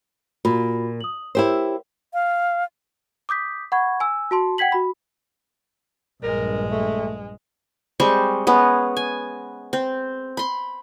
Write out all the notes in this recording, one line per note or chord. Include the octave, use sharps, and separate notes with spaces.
A#2 F4 F#4 B5
D#6 F#7
E4 G4 A#4 C5 C#5
F5
D6 D#6 G6 B6
F#5 B5 C#6 G#6
G#5 E6
F#4 A5 C6
F#5 G5 G#6 B6 F#7
F#4 B5
A#1 G2 G#3 A#4
A3
G3 G#3 C4 C#6
G#3 B3 C#4
G#5
C4
B5 C6